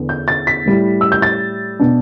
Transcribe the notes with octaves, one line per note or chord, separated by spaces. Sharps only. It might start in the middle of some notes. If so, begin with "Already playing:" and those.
Already playing: E2 D3 B3
G6
A6
B6
A2 G3 E4
E6
G6
A6
B2 B3 D4